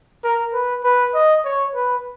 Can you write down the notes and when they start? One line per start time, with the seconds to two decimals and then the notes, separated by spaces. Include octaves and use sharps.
0.24 A#4
0.53 B4
0.84 B4
1.14 D#5
1.45 C#5
1.75 B4